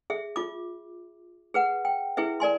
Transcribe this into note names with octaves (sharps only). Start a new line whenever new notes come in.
G#4 E5
F4 D6
G#4 B4 F#5
G5
E4 G#4 B4 E5
A#4 D5 G#5 C6